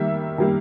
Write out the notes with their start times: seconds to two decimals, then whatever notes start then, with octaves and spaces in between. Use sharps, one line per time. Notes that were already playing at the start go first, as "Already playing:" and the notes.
Already playing: D#3 G3 A#3 E5
0.38 D#3 G3 A#3